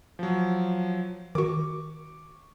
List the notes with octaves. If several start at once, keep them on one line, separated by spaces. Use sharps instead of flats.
F3 F#3
D#3 F#4 C#6 D6